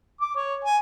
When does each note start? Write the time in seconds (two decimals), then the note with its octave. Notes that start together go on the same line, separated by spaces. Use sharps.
0.21 D6
0.36 C#5
0.65 G#5